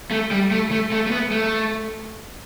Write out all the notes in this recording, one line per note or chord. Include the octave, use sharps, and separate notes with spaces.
A3
G3
A3
A3
A3
A3
B3
A3